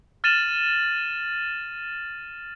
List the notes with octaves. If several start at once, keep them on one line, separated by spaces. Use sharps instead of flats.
F6 A6 D#7 E7 F#7